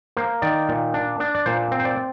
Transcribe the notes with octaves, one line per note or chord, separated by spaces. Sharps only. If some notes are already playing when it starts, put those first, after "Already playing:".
A#3 C5
D#3 D5
A#2
D4
D4
D5
A#2 C5
C4
C5
D5